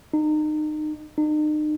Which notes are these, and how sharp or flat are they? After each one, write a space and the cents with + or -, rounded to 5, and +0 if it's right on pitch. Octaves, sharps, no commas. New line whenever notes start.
D#4 -30
D#4 -40